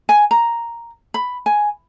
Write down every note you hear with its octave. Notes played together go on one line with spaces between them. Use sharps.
G#5
A#5
B5
G#5